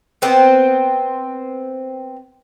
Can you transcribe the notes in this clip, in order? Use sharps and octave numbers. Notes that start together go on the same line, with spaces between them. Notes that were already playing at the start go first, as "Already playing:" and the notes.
B3 C4 C5